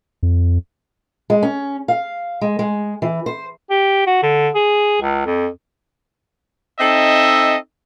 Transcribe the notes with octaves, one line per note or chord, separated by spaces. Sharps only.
F2
G#3
C#4
F5
G#3
G#3
E3
C5
G4
F#4
D3
G#4
C#2
F2
C4 D#4 A4 D#5 E5